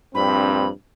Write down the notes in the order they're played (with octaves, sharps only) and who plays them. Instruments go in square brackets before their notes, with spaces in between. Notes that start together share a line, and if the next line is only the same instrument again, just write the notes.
[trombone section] A#1 G2 C4 [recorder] B5